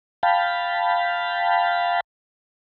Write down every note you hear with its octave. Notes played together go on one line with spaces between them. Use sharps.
F5 G5 A5 B5